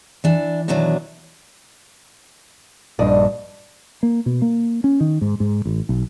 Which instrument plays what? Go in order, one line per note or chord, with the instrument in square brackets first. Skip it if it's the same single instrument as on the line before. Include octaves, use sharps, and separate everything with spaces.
[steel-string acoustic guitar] E3 D4
B2 D#3 E3 F#3 D4
[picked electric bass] A#1 G2 [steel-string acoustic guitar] D5 D#5 A5
[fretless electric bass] A#3
B2
A#3
C#4
D#3
G#2
G#2
A1
B1